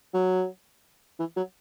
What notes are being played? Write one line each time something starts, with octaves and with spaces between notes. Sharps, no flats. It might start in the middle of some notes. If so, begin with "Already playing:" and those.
F#3
E3
F#3